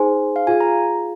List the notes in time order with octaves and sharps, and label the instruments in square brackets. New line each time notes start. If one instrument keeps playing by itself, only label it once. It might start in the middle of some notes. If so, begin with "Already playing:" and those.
Already playing: [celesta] D#4 G#4 C5 G#5 C6
[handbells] F5
[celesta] F4 G#4 F5 [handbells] G#5
[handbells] A#5